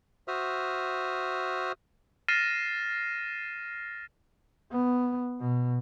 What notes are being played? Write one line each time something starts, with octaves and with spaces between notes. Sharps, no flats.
F#4 C5 E5 D#6 F6
F6 A6 A#6 C7 D#7 E7
B3
B2